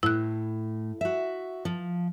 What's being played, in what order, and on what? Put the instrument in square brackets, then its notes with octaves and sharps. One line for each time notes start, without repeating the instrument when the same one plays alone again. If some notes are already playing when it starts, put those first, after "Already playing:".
[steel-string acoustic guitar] A2 [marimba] E4 F#6
[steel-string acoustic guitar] F#4 E5
F3